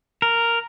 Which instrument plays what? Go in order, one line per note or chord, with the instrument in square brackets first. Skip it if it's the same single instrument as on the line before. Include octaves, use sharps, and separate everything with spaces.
[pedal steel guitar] A#4